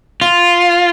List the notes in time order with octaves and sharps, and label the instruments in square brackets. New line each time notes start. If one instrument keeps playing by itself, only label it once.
[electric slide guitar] F4